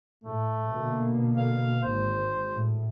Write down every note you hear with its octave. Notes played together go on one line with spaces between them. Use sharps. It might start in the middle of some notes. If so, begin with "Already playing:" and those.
A2 A3
B2 D3 A#3
F5
G#1 C5
A2